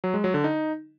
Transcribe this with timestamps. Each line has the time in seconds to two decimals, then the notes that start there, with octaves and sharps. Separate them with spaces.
0.04 F#3
0.14 G#3
0.24 F#3
0.34 D3
0.44 D#4